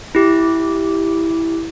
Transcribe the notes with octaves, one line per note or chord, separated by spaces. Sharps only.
E4 G4